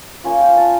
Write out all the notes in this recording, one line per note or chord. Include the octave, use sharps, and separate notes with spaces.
A#3 C#4 F4
G5
A5